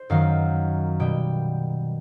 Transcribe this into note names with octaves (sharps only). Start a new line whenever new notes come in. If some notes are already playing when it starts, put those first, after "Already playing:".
Already playing: C5
F#2 D#3 F#3 F5
B2 G3 G5